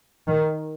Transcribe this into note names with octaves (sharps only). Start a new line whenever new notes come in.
D#3